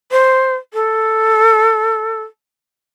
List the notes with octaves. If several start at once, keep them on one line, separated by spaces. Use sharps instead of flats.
C5
A4